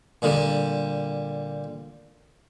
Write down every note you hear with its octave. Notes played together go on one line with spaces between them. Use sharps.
A#2 D3 G3